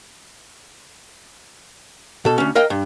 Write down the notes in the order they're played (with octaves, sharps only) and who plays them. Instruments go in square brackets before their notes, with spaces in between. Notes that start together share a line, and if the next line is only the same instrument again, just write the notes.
[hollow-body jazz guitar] B2 A4
D2 C#4
A#4 D#5 F5 G5
G2